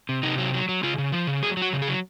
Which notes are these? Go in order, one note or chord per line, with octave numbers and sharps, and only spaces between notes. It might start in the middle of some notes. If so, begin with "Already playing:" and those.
C3
C3 D#4
F#3
F#3
F#3
C#3 F4
C#3
F3
C#3
F#3 G#4
F#3 F#4
C#3
G#4
F#3